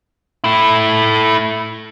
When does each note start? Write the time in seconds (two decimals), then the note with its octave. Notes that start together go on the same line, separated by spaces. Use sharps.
0.44 A3 E4